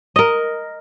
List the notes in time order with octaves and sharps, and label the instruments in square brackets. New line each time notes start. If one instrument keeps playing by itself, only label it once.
[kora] A#4 D#5